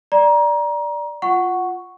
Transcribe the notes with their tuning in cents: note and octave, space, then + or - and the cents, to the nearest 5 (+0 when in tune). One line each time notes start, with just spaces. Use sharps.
D5 +0 A#5 +25
F4 +0 F#5 +0 C#6 +0